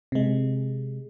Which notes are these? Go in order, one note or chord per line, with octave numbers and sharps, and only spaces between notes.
C3 G#3